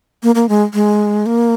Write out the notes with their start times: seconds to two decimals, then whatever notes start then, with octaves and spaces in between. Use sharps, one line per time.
0.23 A#3
0.35 A#3
0.49 G#3
0.74 G#3
1.26 A#3